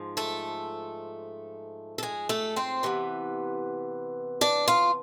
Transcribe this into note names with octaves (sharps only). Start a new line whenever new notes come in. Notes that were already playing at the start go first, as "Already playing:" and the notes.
Already playing: G#2 F3
A3 A4
A4
G#3 G#4
A3 A4
C4 C5
C3 E3 B3
D4 D5
F4 F5